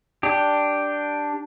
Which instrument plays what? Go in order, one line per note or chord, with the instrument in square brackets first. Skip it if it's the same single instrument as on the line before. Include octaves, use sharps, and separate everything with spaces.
[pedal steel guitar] D4 G4